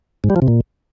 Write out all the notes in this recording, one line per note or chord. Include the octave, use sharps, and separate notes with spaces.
G#2
G3
F3
C3
A#2